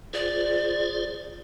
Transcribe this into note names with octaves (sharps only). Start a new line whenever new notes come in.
F4 G#4 C5 D5